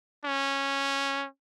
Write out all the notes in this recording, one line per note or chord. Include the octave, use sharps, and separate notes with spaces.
C#4